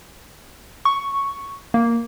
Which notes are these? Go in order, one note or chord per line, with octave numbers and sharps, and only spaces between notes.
C#6
A#3